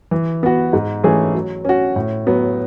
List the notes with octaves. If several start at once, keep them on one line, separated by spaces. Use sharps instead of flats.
E3
B3 F#4
G#2
E3 A3 C#4 G#4
F#3
C#4 F#4
A2
F#3 B3